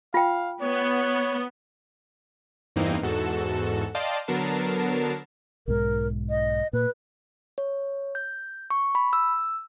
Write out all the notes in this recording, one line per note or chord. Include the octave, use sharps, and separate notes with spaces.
F4 F5 G5
B3 C#5
E2 G2 E3 A#3 C4 D#4
E2 G#2 F#4 A4 E7
D5 D#5 F5 G5 A5 C6
D3 F#3 B3 A#4 A5 C7
B1 G#2 A#4
D#5
A#2 B4
C#5
G6
C#6
B5
E6